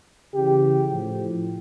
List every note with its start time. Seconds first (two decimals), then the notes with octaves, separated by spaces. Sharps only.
0.35 C#3 E3 G4
0.89 A2 F3